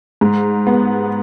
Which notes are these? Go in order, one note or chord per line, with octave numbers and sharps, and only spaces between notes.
G#2
B3